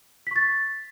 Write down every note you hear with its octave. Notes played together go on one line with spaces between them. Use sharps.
C#6 A6 B6